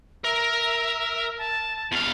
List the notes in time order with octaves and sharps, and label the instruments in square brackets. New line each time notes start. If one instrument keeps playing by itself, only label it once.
[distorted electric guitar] A#4 [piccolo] E5
[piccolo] A5
[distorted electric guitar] E2 F5